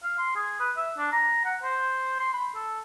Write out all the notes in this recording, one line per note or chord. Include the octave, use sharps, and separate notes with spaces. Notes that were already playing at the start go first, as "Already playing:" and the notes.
F5
C6
G#4
B4
E5
D4
A#5
F#5
C5
C6
B5
A4